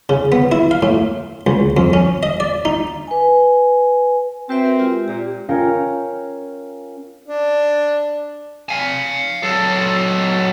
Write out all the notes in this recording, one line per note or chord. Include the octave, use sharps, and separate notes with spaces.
C#3
B3
E4
F5
A2
C#2
F2
C#4
D#5
D5
D#4
B4 G#5
C4 F#4 B4 E5
A#4
G#3 F4 G4
A#2 G4
C#4 F4 A#4 F5 G5 C#7
D4
F5 G#5
F#3 A4